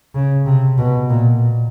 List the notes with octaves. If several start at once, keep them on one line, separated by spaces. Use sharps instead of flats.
C#3
C3
B2
A#2